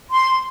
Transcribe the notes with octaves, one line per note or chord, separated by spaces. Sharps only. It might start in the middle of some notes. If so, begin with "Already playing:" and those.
C6